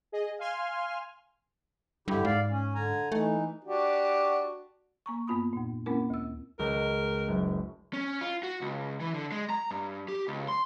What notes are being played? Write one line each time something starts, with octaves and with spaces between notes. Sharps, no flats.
G#4 D#5
F5 G#5 C6 F6
G2 D3 E4 G4
G#2 D5 F5
C#4
D3 G#5 A#5
E3 A3 D#4
D4 F#4 G4
A#3 A#5 C#6
G2 A#3 B3 F4 B5 D#6
F2 A#2
G#3 A#3 C4 C#4 E4 A#4
D2 E6
C#2 A#4
F#1
C#4
F4
F#4
C#2
E3
D3
G#3
A#5
G2
G4
C#2
C6